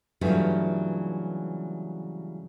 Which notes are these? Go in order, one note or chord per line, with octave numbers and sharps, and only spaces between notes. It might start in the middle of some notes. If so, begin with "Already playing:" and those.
G2 C#3 E3 F#3 A3 F4